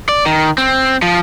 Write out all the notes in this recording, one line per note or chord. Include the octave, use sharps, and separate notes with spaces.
D5
D#3
C4
F3